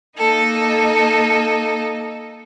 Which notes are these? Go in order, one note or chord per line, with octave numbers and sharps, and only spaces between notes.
A#3 D#4 A4